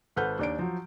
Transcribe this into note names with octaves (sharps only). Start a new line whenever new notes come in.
G#1 A4 B4 F#5 F6 G6
D#2 D4 D7
F3 F#3